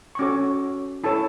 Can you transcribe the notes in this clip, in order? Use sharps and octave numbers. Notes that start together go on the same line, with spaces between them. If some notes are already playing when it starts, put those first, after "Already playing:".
C#6
C#4 F#4 A4 C#5 D6
E4 A4 C#5 A5